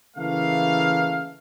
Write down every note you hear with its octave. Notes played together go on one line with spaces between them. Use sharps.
C#3 E3 A3 A#3 F5